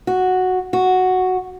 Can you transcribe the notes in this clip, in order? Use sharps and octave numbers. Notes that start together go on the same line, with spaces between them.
F#4
F#4